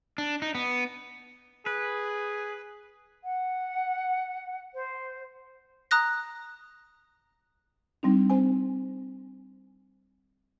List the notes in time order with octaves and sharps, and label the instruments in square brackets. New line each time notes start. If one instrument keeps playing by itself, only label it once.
[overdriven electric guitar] D4
D#4
B3
[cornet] G#4 [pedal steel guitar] B4
[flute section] F#5
C5
[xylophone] A#5 D#6 F#6 A#6
[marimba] G3 C4 D4 D#4
C4 C5 G#5